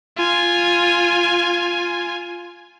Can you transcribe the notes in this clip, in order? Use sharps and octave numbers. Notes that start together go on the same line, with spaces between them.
F4 G#5